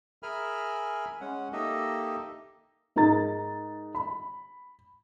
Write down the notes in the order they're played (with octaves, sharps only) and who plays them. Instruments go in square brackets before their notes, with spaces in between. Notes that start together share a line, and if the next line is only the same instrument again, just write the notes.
[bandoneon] G#4 A#4 E5 G#5 B5 F6
G#3 C#4 F#5
A#3 D#4 G4 A4 D#5 E5
[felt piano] G#2 D#4 A#4 A#5 A6
B5